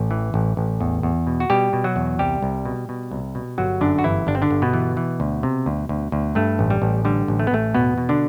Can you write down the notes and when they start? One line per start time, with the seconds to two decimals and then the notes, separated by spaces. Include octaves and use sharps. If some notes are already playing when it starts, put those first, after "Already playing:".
Already playing: A1
0.11 E3
0.34 A1
0.57 A1
0.81 E2
1.03 E2
1.27 B2
1.40 F#4
1.50 B2 G3 G4
1.73 B2
1.84 F#3 F#4
1.96 E2
2.19 C2 G3 G4
2.42 C2
2.65 B2
2.89 B2
3.11 C2
3.35 B2
3.58 G1 F#3 F#4
3.81 F#2 D3 D4
3.99 F#4
4.04 G1 E3 E4
4.27 G1 D4
4.35 C4
4.42 D3 D4
4.51 G1
4.62 B2 B3
4.73 E3
4.97 E3
5.20 D2
5.43 C3
5.66 D2
5.89 D2
6.12 D2
6.35 G2 A3
6.59 A1
6.70 G3
6.82 A1
7.05 D3 G3
7.28 A1
7.39 A3
7.47 B3
7.51 A1 A3
7.74 E2 B2 B3
7.98 B2
8.09 D3 D4